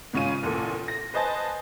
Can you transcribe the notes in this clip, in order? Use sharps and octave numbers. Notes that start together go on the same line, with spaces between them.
G#2 C#3 C#4 F4 D#7
E2 A#2 A4
A#6
B4 C5 D#5 G#5 A5